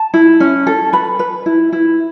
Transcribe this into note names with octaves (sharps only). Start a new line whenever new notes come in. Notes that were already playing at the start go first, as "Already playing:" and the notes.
Already playing: A5
E4
C#4
A4
B4 B5
B4
E4
E4